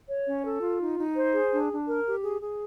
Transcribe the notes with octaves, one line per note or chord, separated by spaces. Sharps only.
C#5
C#4
A4
F4
D#4
D#4
C5
G#4
D4
D4
A#4
G4
G#4
G#4